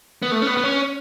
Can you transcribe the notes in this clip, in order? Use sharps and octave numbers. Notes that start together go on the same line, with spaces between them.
B3
A3
C#4
B3
B3
C#4